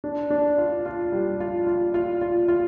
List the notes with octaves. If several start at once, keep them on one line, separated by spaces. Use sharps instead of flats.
D4
D4
F4
F4
G3
F4
F4
F4
F4
F4